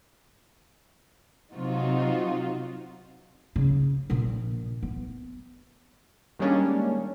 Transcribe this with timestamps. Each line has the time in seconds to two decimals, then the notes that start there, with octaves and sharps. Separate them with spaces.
1.55 C3 F#3 D#4 F4 F#4
3.56 C#3
4.10 A#1 A#2
4.83 B3
6.39 D#3 G3 G#3 A#3 C#4 D4